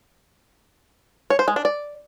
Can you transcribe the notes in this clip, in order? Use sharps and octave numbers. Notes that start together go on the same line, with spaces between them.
C#5
C5
G#3
D4
D5